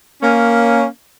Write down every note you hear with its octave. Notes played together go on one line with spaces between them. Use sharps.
A#3 C#4